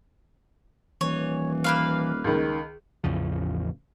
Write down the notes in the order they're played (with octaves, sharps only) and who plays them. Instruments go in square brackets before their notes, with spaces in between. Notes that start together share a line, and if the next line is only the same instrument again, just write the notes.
[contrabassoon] D#1 [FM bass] E3 [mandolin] C#5
[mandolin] A#3 B4 F5
[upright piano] C#2 D#3
[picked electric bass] A1 E2 C#3 F3